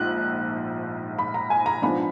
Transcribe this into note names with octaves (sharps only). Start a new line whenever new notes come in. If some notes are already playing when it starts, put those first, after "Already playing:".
Already playing: A#1 G#2 F#6
B5
A#5
G#5
A#5
G#2 F3 B3 D4 B5